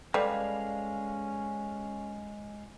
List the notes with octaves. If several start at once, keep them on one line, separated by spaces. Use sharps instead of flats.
G3 G#3 C#4 A4 B4 D5 F5